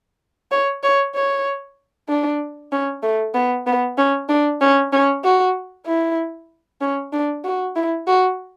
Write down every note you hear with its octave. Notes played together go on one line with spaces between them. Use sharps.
C#5
C#5
C#5
D4
C#4
A3
B3
B3
C#4
D4
C#4
C#4
F#4
E4
C#4
D4
F#4
E4
F#4